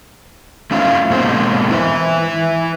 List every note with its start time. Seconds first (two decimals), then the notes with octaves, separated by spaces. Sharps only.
0.71 A3 C#4 E4 F4 F5
1.10 G#2 B2 G#3 A#3 C4 C5
1.71 E4 B4 E5